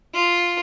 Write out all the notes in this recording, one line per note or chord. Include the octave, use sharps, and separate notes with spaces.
F4